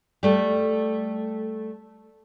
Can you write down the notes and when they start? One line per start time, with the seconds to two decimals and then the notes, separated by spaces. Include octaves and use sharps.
0.23 G3 A3